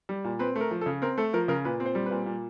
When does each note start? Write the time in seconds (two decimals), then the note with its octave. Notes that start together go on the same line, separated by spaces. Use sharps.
0.09 G3
0.24 A#2
0.39 C4 B4
0.56 A3
0.61 A#4
0.71 F3
0.81 A4
0.86 C#3
1.02 C4 A#4
1.18 A3 A4
1.33 F3 A#4
1.48 C#3 A#4
1.65 A#2 B4
1.80 C4
1.86 C5
1.95 G3
2.06 B4
2.11 A#2
2.26 A#2